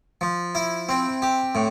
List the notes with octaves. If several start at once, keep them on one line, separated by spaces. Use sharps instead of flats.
F3
E4
C4
G4
A2